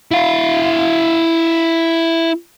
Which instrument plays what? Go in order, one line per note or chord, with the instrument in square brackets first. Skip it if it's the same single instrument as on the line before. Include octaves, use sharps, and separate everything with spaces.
[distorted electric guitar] E4 F5